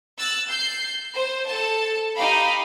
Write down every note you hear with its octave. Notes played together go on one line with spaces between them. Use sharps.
E6 F#6 A6
G6 C7
C5
A4 A5
D#4 G4 F5 B5